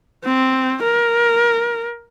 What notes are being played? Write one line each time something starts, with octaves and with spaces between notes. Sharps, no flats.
C4
A#4